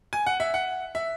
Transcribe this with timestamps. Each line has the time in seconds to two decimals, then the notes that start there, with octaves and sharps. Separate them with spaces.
0.13 G#5
0.26 F#5
0.40 E5
0.54 F#5
0.95 E5